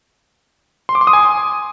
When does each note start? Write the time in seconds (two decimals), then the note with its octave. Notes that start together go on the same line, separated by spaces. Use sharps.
0.89 C6
0.95 D6
1.01 C6
1.07 D#6
1.13 G#5